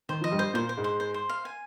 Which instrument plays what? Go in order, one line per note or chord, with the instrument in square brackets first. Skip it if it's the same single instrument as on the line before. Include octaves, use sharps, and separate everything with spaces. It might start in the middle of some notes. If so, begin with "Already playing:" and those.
[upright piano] D#3 [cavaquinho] C5
[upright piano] F3
[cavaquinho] D#5
[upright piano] G2 G3
[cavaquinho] C5
[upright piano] A#2 A#3 [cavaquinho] C5
[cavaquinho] C5
[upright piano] G#2 G#3
[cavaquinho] C5
C5
C5
F5
G#5